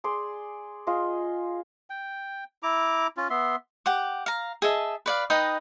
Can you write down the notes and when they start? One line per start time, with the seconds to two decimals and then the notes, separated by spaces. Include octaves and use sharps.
0.04 G#4 D5 C6
0.87 F4 G#4 D#5
1.90 G5
2.63 E4 A#5 D6
3.17 C#4 F4
3.30 B3 E5 C6
3.86 G4 F#5 D6
4.26 F5 A#5
4.62 G#4 D#5 E5 A5
5.06 B4 D5 F5
5.30 D#4 B4 D#5 G5